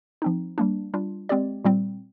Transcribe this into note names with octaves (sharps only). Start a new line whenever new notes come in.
F3 C4 D#4
G3 A#3 D4
G3 D4 F4
G#3 C4 G4 D5
A#2 G3 C4